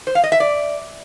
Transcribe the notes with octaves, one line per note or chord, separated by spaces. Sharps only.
C5
F5
D#5
E5
D5